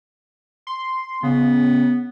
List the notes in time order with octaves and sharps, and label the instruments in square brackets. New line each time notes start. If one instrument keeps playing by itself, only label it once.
[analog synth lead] C6
[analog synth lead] C#3 [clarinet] B3